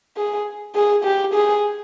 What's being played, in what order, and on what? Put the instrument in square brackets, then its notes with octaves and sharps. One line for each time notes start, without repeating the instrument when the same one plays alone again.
[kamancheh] G#4
G#4
G4
G#4